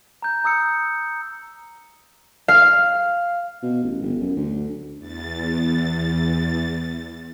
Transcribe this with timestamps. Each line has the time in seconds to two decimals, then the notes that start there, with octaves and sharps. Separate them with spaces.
0.22 A#5 G6
0.44 A#5 D#6 E6 C#7
2.48 F5
3.63 B2
3.83 A1
4.02 G1
4.20 F#2
4.36 D2
4.99 E2 A6